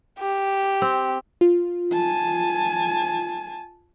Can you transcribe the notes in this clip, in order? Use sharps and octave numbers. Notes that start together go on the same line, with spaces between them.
G4
C4
F4
G#5 A5